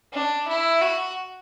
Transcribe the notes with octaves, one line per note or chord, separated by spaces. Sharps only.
D4
E4
F#4